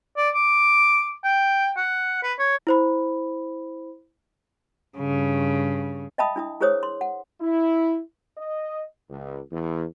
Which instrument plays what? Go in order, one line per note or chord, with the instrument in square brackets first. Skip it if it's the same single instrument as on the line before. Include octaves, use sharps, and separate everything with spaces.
[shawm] D5
D6
G5
F#5
B4
C#5
[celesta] E4 C5 B5
[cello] G2 C#3
[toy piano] D#5 E5 G5 A5 B5 D#6
D4 E4 D#6
E4 G#4 A#4 C5 C#5 D#6
C6
F#5
[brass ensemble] E4
D#5
C#2
E2